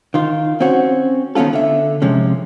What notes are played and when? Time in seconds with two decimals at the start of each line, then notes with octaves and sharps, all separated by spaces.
0.14 D#3 F4
0.61 C4 C#4 F#4
1.35 D#3 B3 C#4 F4 A4
1.53 D3 E5
2.02 C3 F3 G#3 C#4